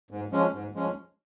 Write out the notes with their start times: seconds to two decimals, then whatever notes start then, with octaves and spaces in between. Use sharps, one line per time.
0.11 G#2
0.32 F3 G#3 C#4
0.53 G#2
0.75 F3 G#3 C#4